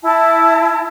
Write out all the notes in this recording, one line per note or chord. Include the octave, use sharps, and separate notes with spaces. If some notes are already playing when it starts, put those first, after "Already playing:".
E4 A5